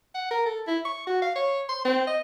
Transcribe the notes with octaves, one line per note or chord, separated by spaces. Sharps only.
F#5
A#4
A4
E4
C#6
F#4
F5
C#5
C6
C4
D#5